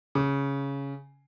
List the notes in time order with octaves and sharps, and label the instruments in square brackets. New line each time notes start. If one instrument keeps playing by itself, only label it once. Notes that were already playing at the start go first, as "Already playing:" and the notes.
[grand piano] C#3